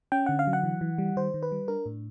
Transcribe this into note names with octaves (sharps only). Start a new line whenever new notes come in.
C#4 G5
D3 F#5
F5
F#3
F#5
E3
E3
G3
D#3 C5
D#3
B4
G3
D4 A#4
A2